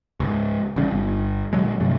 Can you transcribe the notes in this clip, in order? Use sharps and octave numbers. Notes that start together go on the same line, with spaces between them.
C#2 G#2
A1 C#3 G3
G1
A#2 D3 F#3 G#3
G2 C3 F#3 A3